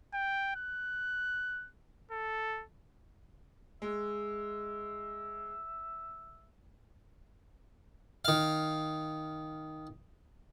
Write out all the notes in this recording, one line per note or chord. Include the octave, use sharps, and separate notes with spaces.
G5
F#6
A4
G#3 E5
D#3 F5